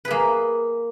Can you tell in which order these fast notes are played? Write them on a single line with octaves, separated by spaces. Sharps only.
B4 G#4 A#3